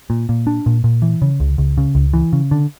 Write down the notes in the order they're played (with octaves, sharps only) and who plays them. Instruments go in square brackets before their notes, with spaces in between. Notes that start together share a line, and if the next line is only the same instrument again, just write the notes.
[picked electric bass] A#2
A#2
D4
A#2
A#2
E3
C#3
C#2
C#2
C#3
C#2
E3
C#3
D3